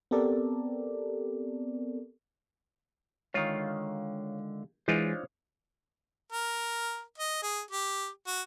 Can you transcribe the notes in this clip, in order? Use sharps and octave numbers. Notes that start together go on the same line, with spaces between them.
B3 C4 G4 A4 A#4 D5
D3 D#3 G#3 F4 C#5 F5
E3 G#3 D4 D#4 F4 C5 C#5
A#4
D#5
G#4
G4
F#4